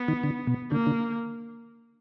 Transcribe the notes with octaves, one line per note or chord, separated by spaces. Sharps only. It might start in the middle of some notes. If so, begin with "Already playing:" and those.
Already playing: B3
D#3
D3
B2
D3 A#3
D3